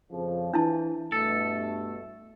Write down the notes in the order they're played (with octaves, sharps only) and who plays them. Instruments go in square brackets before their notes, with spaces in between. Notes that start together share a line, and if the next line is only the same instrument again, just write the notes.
[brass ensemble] F2 C#3 F3
[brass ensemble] E3 [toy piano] D4 E4 A5
[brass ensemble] G2 B2 A3 [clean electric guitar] A4